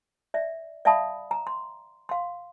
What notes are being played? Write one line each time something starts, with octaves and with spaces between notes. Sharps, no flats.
D5 E5
D5 E5 F5 A5 B5 D#6
A#5
C6
F5 C6